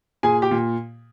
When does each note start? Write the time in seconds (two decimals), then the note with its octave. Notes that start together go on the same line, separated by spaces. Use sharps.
0.23 A#2 G#4 G#5
0.42 G4 G5
0.51 A#2